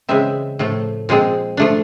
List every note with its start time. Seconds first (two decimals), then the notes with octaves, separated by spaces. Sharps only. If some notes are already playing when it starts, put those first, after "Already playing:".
0.09 C#3 E3 G#3 C4 E5
0.59 A2 F3 A3
1.09 A#2 F3 G#3 C4
1.57 F3 A3 D4